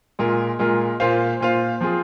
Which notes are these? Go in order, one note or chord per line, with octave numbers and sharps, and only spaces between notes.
A#2 G#3 F4 A#4
A#2 G#3 F4 A#4
A#2 A#3 F4 C5 F5
A#2 A#3 F4 C5 F5
F3 C4 F4 G#4